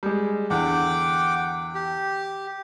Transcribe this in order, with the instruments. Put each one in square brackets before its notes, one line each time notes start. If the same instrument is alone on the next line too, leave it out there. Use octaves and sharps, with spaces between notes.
[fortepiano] G3 G#3
[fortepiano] E2 D3 [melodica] F#5 G5 D6
[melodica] G4